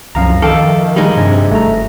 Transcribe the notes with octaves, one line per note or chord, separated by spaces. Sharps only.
C2 F#2 F3 F5 A#5
D#3 A4 E5 F5 G5 A5 D6
G3 G#3 D#4
G2 C3 G#5
F#1 A3 A#5